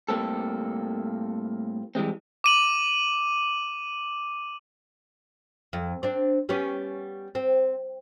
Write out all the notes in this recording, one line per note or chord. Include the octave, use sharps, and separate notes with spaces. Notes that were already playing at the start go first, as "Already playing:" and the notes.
A2 G3 A#3 C4 A4
E3 G3 G#3 C4
D6 D#7 F#7
F2
C4 D4
G3 B3 C#4
C4